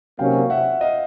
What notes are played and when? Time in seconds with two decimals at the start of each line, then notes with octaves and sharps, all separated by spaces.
0.19 C3 D#3 F#3 A#3 C#4 F5 G5
0.50 E5 F#5
0.81 D#5 F5